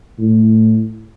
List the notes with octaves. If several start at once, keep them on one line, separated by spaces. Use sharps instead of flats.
A2